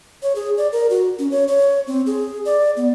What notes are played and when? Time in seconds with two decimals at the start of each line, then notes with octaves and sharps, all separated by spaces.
0.23 C#5
0.36 G#4
0.57 D5
0.72 A#4
0.90 F#4
1.19 C#4
1.31 C#5
1.48 C#5
1.87 C4
2.06 G#4
2.45 D5
2.77 B3